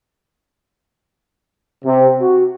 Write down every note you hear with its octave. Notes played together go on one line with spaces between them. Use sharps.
C3
F#4